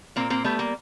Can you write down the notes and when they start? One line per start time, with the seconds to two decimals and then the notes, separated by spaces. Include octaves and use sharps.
0.16 A#2 A#3 C4
0.30 A#3 C4
0.44 G3 A3 B3
0.59 A#3